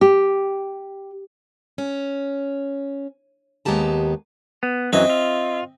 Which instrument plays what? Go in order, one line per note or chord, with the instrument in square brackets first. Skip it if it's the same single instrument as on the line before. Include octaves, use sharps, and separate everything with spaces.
[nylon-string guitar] G4
[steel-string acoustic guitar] C#4
D#2 G#3 B3 G4 A5 A#5
[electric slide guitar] B3
[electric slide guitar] F#2 E3 F#3 [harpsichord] C4 D#5 E5
[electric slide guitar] F4